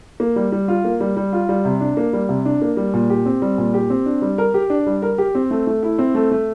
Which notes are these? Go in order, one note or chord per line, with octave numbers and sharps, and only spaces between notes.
A#3
G3
G3
F4
A#3
G3
G3
F4
G3
C3
D4
A#3
G3
C3
D4
A#3
G3
A#2
G4
C4
G3
A#2
G4
C4
D4
G3
A#4
G4
D4
G3
A#4
G4
C4
A3
A3
E4
C4
A3
A3